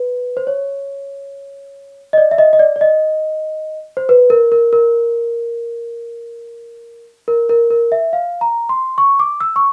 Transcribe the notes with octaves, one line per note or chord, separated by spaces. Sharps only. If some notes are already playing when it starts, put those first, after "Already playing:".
Already playing: B4
C5
C#5
D#5
D5
E5
D#5
D#5
D5
D5
D#5
C5
B4
A#4
A#4
A#4
A#4
A#4
A#4
E5
F5
A#5
C6
C#6
D6
E6
C#6